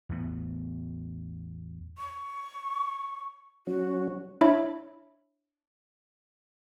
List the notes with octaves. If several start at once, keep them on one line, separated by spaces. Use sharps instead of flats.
E2 A2 B3
C#6
F#3 C#4 F#4
D4 E4 C#5 E5 B5